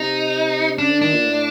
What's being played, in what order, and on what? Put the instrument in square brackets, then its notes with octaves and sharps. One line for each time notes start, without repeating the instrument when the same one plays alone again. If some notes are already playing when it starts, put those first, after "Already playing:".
Already playing: [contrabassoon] C3 [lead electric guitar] D#4
[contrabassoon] C#3 [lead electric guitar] D4
[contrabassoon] D3
[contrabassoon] D#3 [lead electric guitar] D4
[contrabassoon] A#2
A2